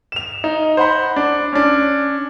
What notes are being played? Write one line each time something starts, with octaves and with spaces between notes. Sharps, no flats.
E7 F7
D#4
C5 F#5 B5
D4
C#4 D4